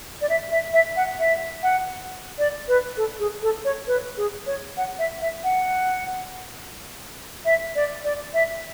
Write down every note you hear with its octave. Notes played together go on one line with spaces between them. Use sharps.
D5
E5
E5
E5
F#5
E5
F#5
D5
B4
A4
G#4
A4
C#5
B4
G#4
C#5
F#5
E5
E5
F#5
E5
D5
D5
E5